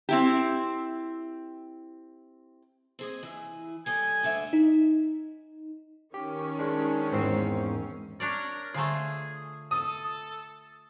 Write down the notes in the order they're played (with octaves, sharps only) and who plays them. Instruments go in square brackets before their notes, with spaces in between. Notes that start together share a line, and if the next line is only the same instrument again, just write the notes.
[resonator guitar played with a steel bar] C4 E4 G4
[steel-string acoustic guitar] C4 G#4 D#5
E3 E4 G#5
[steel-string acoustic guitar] G3 A4 D#5 [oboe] G#5
[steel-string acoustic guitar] D2 D3 E5
[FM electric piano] D#4
[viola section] D#3 C#4 [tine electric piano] G4
[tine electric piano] G#3 D4
[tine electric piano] E2 C4 C7 [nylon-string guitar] G#2
[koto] D4 C#5 D5 [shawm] A#4
[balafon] D3 G#5 A#5 [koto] A3 F4 [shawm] G#4
[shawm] A4 [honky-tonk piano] D#6